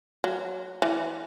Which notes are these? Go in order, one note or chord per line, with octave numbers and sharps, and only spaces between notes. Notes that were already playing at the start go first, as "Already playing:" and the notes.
F#3
E3